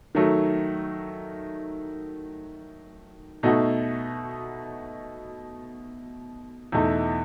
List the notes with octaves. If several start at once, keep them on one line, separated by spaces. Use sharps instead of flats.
D#3 F#3 A3
B2 A3 D#4 F#4
E2 B2 A3 D#4